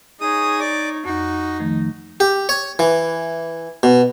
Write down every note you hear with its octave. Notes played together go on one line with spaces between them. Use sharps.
D#4 G#4 C#5 D#6
D5 D6
F2 D#4 F#4
D#3 F3 A3
G4
C#5
E3
B2